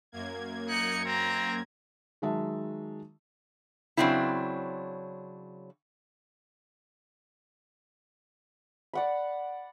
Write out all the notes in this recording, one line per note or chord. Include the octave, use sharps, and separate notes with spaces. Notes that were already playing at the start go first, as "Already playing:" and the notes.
F#2 A#3 G#6
D#4 F#6 C#7
C4 A#5
D#3 F#3 G#3 E5 A5
C#3 F3 F#3 C4 D4 E4
D5 F#5 B5